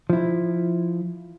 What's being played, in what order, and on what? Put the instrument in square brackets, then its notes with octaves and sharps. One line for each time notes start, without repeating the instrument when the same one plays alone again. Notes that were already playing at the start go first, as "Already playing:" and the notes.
[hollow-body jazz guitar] F3 E4